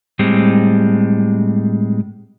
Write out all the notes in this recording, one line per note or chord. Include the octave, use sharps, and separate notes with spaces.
A2 G3 G#3 C4